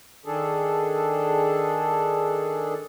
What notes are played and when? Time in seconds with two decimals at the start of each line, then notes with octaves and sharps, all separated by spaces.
0.26 D#3 D4 G#4 A4